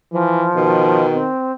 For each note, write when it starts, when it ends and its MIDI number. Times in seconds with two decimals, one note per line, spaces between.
0.12 0.47 52
0.12 1.06 53
0.56 1.18 47
0.56 1.28 51
1.14 1.52 60